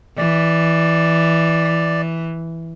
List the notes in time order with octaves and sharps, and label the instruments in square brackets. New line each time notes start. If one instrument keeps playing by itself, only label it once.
[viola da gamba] E3 [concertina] D5